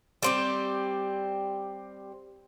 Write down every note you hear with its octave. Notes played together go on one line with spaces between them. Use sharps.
G3 C4 G4